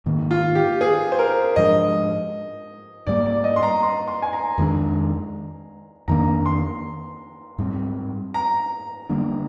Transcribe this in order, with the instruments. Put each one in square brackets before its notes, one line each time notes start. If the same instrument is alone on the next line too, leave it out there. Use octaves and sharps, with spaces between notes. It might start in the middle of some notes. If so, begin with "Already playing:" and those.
[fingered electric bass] G#2 D#3 A#3
[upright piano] F4
G4
G#4
C5
A#4
[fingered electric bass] G#2 F3 G#3 D4 [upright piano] D#5
[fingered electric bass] G#2 G3 A#3 [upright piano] D5
[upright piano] D5
D#5
C6
A#5
C6
C6
G#5
A#5
[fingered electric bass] F2 D#3 G#3 D4
[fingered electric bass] F2 D#3 A#3 D4 [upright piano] A#5
[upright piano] C6
[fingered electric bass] G#2 G3 C4
[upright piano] A#5
[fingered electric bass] D3 G3 A#3 D4